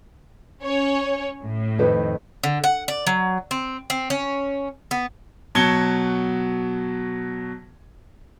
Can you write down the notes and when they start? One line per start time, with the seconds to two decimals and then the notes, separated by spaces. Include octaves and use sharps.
0.62 C#4 C#5
1.44 A2
1.79 F2 D#3 B4
2.44 D3
2.64 F#5
2.88 D5
3.07 F#3
3.51 C4
3.90 C4
4.10 C#4
4.91 B3
5.55 B2 F#3 A5 G#6 C#7 G7